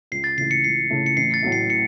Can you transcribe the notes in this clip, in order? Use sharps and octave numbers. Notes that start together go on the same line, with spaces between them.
C#2 C7
A6
C#3 E3 A3 C7
C#7
C#2 C7
C#3 E3 A3
C#7
A1 C7
A6
A2 F#3 A3
C7
C#7